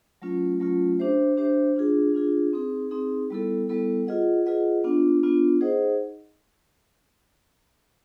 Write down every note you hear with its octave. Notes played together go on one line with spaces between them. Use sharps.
F#3 A3 C#4 F4
F#3 A3 C#4 F4
D4 G4 C5 E5
D4 G4 C5 E5
D4 F4 G#4
D4 F4 G#4
C4 D#4 G#4
C4 D#4 G#4
G3 B3 E4 A4
G3 B3 E4 A4
F4 G#4 B4 D#5 F#5
F4 G#4 B4 D#5 F#5
B3 D4 F4
B3 D4 F4
D#4 G#4 C5 D#5 F#5